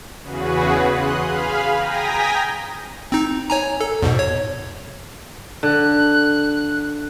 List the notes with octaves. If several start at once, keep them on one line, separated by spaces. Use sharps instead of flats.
E2 C#3 F#4 G#4 B4
C6 D#6 F#6
G#4 F5 B5 F6
G5 G#5 A#5 D#6 A#6 B6
C4 D#4
C#5 G#5 A#5
A4
E2 G#2 B2
C#5
D3 F#6